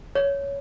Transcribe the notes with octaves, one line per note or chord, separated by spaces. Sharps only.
C#5